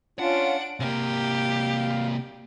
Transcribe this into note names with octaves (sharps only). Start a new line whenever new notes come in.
C#4 D4 F4 F#5 D7
C3 A#3 G4 F5